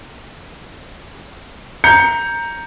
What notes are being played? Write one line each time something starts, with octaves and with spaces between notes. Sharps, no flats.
A#5 G6 C#7